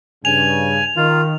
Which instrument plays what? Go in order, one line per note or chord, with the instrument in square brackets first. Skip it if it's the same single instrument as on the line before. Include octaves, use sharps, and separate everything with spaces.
[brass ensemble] G2 C#3 [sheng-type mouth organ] G#5 [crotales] F7
[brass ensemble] D#3 [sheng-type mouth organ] F4